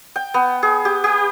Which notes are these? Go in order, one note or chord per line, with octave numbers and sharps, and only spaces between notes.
G5
B3
G#4
G4
G4